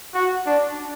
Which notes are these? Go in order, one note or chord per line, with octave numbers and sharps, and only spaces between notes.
F#4
D4